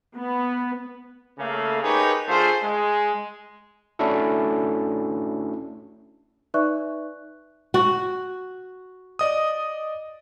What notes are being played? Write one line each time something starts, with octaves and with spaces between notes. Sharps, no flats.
B3
C#3 A3 A#3
D#4 G4 G#4 A#4 B4 C#5
D3 A3 F4 G#4 C5
G#3
A3 C#4 D4 E4 F#4 A4
D#4 B4 D5 E5 C#6 F#6
F#4
D5 D#5 D#6